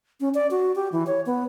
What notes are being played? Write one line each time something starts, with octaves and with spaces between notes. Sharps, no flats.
C#4
D5
F#4
G4
E3
C#5
B3